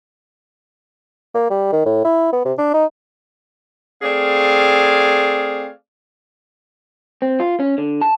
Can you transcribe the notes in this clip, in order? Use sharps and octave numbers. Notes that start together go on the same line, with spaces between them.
A#3
G3
D#3
A2
E4
B3
C3
D4
D#4
A3 C4 G#4 D5 F5
C4
F4
C#4
D3
A5